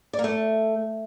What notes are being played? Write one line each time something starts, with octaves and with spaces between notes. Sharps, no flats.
D5
A#3
A3